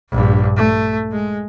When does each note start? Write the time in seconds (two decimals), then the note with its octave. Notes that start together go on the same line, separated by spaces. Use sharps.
0.10 A#1 G2
0.56 A3
1.11 G#3